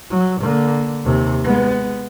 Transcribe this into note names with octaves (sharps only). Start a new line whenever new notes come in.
F#3
D3 A#3
D#2 C3
G#3 B3